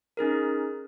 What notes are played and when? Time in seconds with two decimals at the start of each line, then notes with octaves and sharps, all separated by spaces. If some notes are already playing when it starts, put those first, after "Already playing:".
0.17 C#4 D#4 G#4 A#4